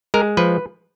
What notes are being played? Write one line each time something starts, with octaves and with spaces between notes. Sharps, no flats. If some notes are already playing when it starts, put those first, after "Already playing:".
G#3 A#4
F3 B4